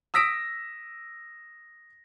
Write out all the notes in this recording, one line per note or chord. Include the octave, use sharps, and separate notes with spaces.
D#6 E6 A#6 B6 D7